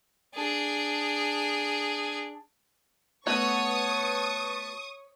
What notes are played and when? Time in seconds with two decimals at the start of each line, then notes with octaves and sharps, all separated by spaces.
0.35 D4 G#4
3.27 A3 B3 F#4 B4 C#5 A5 C#6 D#6